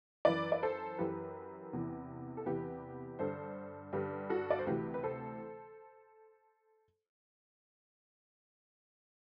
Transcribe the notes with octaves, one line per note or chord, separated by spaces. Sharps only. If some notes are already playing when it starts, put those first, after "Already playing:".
F#2 E3 B4 D5
D5
A4 C5
F#2 E3 G4 B4
E2 C3 E3
A4
E2 C3 E3 G4 B4
G2 D3 A4 C5
G2 D3 G4 B4
F#4 A4
D5
C5
D2 C3 E3 G4 B4
B4
A4 C5